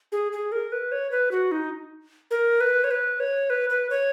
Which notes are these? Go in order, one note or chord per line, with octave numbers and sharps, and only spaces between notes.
G#4
G#4
A#4
B4
C#5
B4
F#4
D#4
A#4
B4
C#5
B4
C#5
B4
B4
C#5